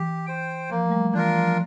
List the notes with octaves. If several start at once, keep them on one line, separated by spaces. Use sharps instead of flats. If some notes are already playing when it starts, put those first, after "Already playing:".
Already playing: E3 G4
C5 G5
F3 A#3
A3
G3
E3 D4 F4 A#4
F3